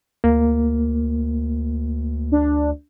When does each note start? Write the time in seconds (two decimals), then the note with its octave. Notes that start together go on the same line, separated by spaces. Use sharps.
0.24 D2 A#3
2.32 D4